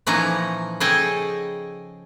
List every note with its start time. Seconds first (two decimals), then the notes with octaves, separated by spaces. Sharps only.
0.07 A#2 E3 F3 C#4 D#4 A#5
0.80 C#3 G#4 A4 D#5 G5 G#5